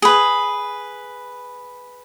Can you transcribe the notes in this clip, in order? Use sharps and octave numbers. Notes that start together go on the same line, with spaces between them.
G#4 B4